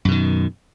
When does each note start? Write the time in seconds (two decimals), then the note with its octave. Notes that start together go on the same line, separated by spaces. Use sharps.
0.05 F#2
0.08 B2
0.11 D#3